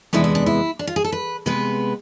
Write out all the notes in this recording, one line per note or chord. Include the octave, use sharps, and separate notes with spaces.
E2 C3 G#3 B3 D4 E4
E4
D4
E4
D4
F4
G#4
A4
B4
C3 G#3 B3 B4